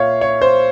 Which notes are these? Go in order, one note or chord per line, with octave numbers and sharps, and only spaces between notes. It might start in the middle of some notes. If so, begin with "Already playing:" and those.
Already playing: A#2 C#5 E5 F5
C#5
C5